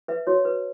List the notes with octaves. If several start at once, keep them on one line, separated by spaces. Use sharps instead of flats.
B4 E5
F#4 C#5
B4